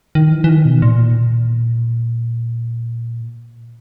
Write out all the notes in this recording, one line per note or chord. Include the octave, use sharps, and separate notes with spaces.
D#3
E3
E3
D#3
B2
A#2